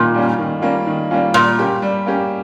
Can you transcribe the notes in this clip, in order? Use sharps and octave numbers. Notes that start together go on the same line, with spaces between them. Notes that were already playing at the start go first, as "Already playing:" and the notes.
Already playing: A#2 D#3 G3 A#3 C#4 F4
G3 A#3 C#4 F4
D#3
G3 A#3 C#4 F4
D#3
G3 A#3 C#4 F4
A#2 G3
A#3 C#4 G4
G3
A#3 C#4 G4